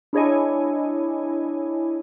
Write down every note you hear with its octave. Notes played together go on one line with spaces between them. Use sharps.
D4 E4 G#4 C#5 D#5 G#5